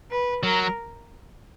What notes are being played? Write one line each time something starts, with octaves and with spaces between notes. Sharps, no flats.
B4
F#3 A#4